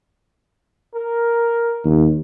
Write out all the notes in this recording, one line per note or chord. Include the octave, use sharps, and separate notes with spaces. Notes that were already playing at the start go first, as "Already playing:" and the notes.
A#4
D#2